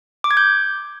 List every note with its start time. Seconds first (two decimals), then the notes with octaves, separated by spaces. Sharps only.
0.24 D6
0.31 G#6
0.37 G6